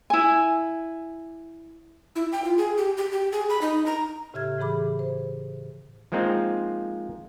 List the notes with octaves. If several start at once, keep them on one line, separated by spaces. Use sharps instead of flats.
E4 G#5
E4
G5
F4
G#4
G4
G4
G4
G#4
B5
D#4
A#5
A2 C#3 G4 E5 F6 G#6
A2 C#3 E3 G#4 B5 D6
C5
F3 G#3 A#3 C4 D#4